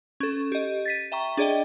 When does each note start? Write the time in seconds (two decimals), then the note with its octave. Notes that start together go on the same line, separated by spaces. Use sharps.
0.20 C#4 A4
0.52 G4 D#5
0.86 A6 B6 D#7
1.12 E5 G5 A#5 C#6
1.37 D4 G#4 D5 D#5 G5